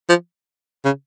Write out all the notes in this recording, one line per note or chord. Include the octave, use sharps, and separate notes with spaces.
F3
C#3